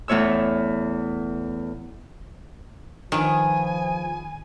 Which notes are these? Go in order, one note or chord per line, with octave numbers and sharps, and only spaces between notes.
E2 A2 C#5 E6
D#3 F3 B3 G#4 G#5